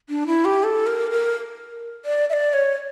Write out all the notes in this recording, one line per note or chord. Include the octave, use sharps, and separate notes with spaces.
D4
E4
G4
A4
A#4
A#4
D5
E5
D5
C#5